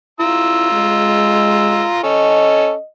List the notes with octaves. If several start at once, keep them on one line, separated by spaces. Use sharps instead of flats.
E4 F4 A#5 E6
G#3
C#4 A4 D#5